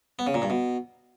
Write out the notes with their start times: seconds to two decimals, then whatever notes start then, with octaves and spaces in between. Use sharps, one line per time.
0.19 B3
0.27 C#3
0.34 A#2
0.42 G2
0.50 B2